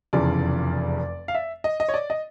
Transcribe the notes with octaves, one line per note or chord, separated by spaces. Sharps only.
F1 E2 C#3 F3 D5
F5
E5
D#5
D#5
C#5
D5
D#5